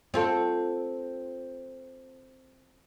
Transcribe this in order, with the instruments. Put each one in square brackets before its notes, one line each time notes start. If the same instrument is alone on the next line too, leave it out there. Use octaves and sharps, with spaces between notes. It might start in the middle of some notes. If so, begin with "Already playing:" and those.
[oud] C4 F4 A4